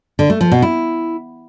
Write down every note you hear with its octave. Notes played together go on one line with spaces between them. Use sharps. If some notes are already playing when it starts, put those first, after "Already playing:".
D3
A3
F3
B2
E4